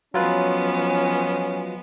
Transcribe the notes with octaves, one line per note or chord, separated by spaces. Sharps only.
F3 F#3 G#3 B3 C#4 F4 B4